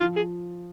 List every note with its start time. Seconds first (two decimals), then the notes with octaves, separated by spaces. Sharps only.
0.01 F3 F4
0.16 G#4